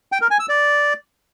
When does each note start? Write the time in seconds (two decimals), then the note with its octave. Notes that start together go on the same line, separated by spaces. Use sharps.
0.12 G5
0.21 A#4
0.31 G#5
0.40 E6
0.49 D5